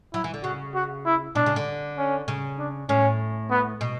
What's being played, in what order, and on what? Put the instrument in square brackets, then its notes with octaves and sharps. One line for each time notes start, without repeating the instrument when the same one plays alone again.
[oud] F#3 [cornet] E4
[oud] E3
D3
[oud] C#3 [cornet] F#4
[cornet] F#4
E4
[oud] B2 [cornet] D4
[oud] C#3
D3
[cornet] C#4
[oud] C#3
[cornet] D4
[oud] A2 [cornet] C#4
[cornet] B3
[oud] B2